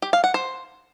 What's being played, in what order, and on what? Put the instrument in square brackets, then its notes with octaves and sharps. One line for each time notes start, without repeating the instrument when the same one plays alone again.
[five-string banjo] G4
F5
F#5
C5